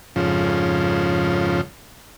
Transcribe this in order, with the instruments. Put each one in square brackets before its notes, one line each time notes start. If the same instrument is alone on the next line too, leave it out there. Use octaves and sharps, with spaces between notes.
[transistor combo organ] F2 G#2 C#3 F3